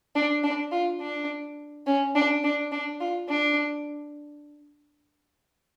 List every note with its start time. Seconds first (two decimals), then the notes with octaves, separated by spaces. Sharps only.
0.15 D4
0.44 D4
0.72 F4
1.01 D4
1.87 C#4
2.15 D4
2.44 D4
2.72 D4
3.01 F4
3.29 D4